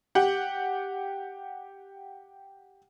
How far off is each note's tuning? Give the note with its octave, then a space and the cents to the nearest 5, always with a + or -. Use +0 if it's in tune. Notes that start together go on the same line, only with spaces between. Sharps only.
G4 +0 F#5 +0